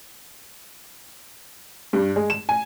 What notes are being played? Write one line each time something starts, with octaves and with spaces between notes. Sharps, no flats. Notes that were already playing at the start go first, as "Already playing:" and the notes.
G2
G#3
E7
G#5